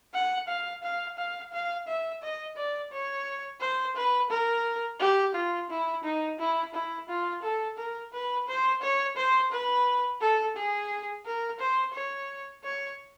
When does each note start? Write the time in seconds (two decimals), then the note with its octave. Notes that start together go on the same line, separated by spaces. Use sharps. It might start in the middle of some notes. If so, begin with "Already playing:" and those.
0.14 F#5
0.48 F5
0.83 F5
1.18 F5
1.53 F5
1.88 E5
2.22 D#5
2.57 D5
2.92 C#5
3.61 C5
3.96 B4
4.31 A#4
5.00 G4
5.35 F4
5.70 E4
6.04 D#4
6.39 E4
6.74 E4
7.09 F4
7.43 A4
7.77 A#4
8.13 B4
8.48 C5
8.82 C#5
9.17 C5
9.52 B4
10.21 A4
10.57 G#4
11.26 A#4
11.60 C5
11.94 C#5
12.64 C#5